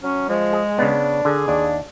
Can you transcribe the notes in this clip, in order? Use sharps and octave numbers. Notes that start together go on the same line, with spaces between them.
F#3 C#4
F3 G#3
G#4
C#3 B3 D4
D3 G#4
D#2 D4